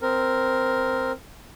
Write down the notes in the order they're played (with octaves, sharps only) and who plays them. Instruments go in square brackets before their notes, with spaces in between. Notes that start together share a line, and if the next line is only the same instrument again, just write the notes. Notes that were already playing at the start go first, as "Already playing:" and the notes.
[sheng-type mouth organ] C4 A#4